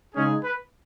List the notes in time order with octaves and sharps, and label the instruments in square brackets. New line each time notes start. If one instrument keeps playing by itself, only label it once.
[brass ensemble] C#3 G#3 D#4 G#4 [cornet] C#4
[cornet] B4